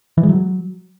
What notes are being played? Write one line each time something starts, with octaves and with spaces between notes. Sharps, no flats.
E3
G#3
F#3